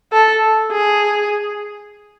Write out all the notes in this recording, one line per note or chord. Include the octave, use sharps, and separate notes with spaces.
A4
G#4